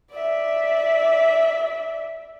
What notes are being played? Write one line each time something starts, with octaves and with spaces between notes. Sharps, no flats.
D5 E5